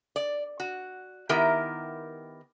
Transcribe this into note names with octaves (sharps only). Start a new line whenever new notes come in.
D5
F#4
D#3 B3 E4 G4 A#4 E5